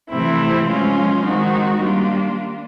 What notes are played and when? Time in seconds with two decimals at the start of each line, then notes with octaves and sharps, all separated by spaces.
0.09 C3 E3 A3 C4 E4
0.66 F3 G#3 C#4 F4
1.24 D#3 G#3 C4 D#4 F#4
1.81 G3 A#3 D4 F4